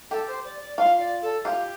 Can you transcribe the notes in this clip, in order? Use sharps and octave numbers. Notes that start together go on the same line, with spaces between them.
G4 A4
C5
D5
D5
F4 F5
D5
A4
F4 G4